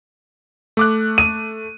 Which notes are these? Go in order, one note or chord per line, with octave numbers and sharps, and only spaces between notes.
A3 D6 F#6
D#7